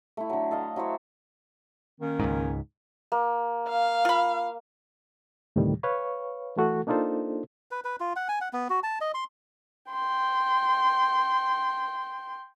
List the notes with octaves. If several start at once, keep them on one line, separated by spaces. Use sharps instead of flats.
A3 E4
D3 F#3
A4 D#5 F5
F#3 E4 C5 C#5
D#3 A#3 C#4
C#2 G#2
A#3
F5
F4 B5
D2 A2 C3 D#3 G3
B4 C#5 F5 C#6
E3 A3 F#4 A4
A#3 D4 D#4 F4 A4 C5
B4
B4
F4
F#5
G#5
F#5
B3
F#4
A5
D#5
C6
G5 C6